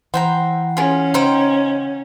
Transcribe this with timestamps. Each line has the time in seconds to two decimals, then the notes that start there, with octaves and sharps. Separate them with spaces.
0.14 E3 C5 F#5 G5 A#5
0.77 C#4 F4 G#4
1.14 C#3 D#4 C5 G5